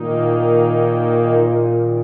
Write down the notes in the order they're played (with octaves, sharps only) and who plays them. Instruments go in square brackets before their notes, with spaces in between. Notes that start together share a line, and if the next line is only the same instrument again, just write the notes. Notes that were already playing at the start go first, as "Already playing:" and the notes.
Already playing: [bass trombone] A#2 [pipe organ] D#3 A#3 D#4
[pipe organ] D#3